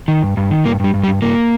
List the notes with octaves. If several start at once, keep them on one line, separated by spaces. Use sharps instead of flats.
D#3
G2
G2
D#3
G2 A#3
G2 G3
G2
G3
G2
G2 A#3